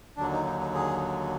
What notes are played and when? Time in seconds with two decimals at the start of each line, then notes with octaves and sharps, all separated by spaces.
0.17 D#2 D3 F#3 D4
0.32 D#4
0.46 D#4
0.61 D#4
0.74 G#4